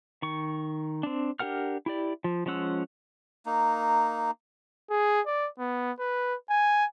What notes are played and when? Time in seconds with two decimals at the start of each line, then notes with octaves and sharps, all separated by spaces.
0.22 D#3 C#6
1.03 C4 D4
1.40 D4 G4 A#4 F#5 F6
1.86 E4 G4 D5
2.24 F3
2.46 F3 G#3 C#4 F#5 E6
3.46 A#3 D#4
4.90 G#4
5.26 D5
5.59 B3
5.99 B4
6.50 G#5